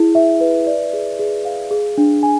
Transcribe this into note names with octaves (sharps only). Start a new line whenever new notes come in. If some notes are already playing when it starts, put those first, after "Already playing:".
Already playing: E4 G#4
E5
B4
D5
G#4
G#4
F5
G#4
D4
G#5